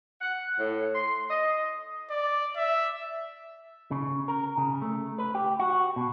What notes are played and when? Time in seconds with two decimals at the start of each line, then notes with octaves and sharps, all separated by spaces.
0.21 F#5
0.59 A2
0.95 C6
1.29 D#5
2.10 D5
2.56 E5
3.91 C#3
4.28 A#4
4.58 C#3
4.82 A3
5.19 B4
5.35 G4
5.59 F#4
5.96 B2